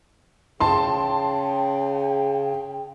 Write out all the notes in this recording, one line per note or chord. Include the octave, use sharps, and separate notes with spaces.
C#3 G5 A5 C6